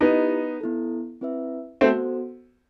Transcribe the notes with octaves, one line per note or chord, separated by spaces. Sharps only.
B3 D#4 E4 G4 D#5
B3 E4 A4
C4 E4 B4 E5
A3 B3 C4 F#4 A4 C5